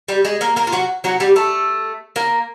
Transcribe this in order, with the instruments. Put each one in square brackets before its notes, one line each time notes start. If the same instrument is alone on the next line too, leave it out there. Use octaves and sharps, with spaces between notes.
[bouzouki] G3 G4
G#3 G#4
A#3 A#4
A#3 A#4
F4
F#3 F#4
F#3 F#4
G3 G4
A3 A4
A#3 A#4